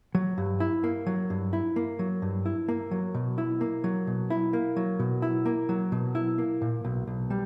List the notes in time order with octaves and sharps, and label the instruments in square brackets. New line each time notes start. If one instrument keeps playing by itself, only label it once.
[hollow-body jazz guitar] F#3
G2
E4
A#3
F#3
G2
E4
A#3
F#3
G2
E4
A#3
F#3
B2
E4
A#3
F#3
B2
E4
A#3
F#3
B2
E4
A#3
F#3
B2
E4
A#3
A#2
B1
B1
G3